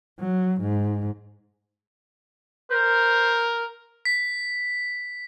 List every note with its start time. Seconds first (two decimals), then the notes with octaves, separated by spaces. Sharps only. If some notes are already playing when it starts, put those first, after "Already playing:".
0.19 F#3
0.61 G#2
2.71 A#4 C5
4.05 B6